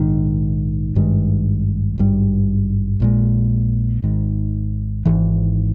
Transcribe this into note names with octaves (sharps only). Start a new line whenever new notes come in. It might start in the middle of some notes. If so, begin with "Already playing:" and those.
Already playing: A#1 G#2 D#3
G#1 G2 D#3 G#3
G#1 G2 G3
A#1 A#2 G#3
G#1 G#2 D#3
G#1 G#2 E3